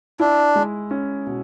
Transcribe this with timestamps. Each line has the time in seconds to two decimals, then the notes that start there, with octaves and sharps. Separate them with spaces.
0.20 D4 E4
0.56 G#3
0.91 C#4
1.27 B2